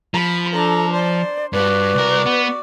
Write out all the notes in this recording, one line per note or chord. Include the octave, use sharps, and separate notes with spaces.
F3 B5
D4 A4 A#5
C5 D5
G2 G3 F#4 B4 D5
C2 A#4
B3